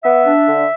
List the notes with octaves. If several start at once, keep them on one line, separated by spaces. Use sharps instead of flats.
B3 E5
D4
D3